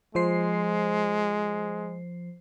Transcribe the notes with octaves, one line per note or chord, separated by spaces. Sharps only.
F3 G#3 C5 C7